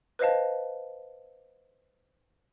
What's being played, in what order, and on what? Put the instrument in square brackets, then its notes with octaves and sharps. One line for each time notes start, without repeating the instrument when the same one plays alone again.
[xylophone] B4 C5 D#5 F5 A5